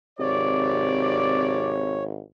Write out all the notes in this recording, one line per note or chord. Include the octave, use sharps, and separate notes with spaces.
G#1 C3 C#5 D5